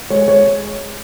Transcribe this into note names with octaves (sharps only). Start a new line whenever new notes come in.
G#3 C#5
G#3 C#5